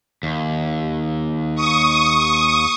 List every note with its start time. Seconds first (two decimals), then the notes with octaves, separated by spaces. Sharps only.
0.23 D#2
1.55 C#6 D#6